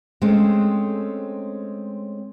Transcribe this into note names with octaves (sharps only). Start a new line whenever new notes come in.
G#3 A3 C4 C#4